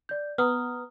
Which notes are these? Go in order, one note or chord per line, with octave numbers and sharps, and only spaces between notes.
D5 G6
B3 A#5 D#6 F6